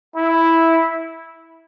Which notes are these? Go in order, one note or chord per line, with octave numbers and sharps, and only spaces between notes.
E4